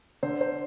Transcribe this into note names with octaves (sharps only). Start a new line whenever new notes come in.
D3 C5
C5